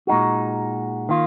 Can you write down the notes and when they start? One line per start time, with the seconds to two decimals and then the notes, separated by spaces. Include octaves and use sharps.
0.07 A#2 G#3 D#4 F#4
1.09 D#3 A#3 F4